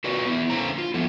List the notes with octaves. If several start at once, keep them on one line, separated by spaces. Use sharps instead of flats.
F4 F#4 A#4 B4 D5
B3 E4
D3 A#3 C#4 C5 A#5
F4
F3 A3 B3 E4